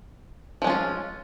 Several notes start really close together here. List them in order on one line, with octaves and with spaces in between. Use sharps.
F3 G#3 C#4 F4